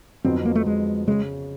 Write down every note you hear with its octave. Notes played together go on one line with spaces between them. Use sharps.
F2 D3 F#3 B3 C4 D#4
A#3
A3
G#3
C#3 G#3